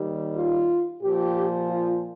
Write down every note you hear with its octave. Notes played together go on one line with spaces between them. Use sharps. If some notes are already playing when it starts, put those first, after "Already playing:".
Already playing: D#2 D#3 G3
F4
A#2 F3 G4
F4